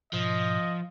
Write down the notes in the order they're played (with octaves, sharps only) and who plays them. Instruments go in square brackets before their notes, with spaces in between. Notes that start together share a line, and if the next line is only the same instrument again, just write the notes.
[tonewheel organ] G#2 B2 [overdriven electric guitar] F3 [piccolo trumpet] D#5